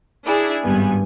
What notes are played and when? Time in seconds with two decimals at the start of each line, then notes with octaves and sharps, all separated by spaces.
0.25 D4 E4 G#4
0.63 G#1 G2 B3 G#5